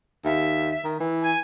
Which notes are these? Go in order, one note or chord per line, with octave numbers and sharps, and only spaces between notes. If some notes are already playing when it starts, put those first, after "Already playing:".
D#2 E5
D#3
E3
G#5